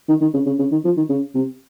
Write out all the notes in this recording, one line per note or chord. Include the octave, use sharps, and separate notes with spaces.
D#3
D#3
C#3
C#3
C#3
D#3
F3
D#3
C#3
C3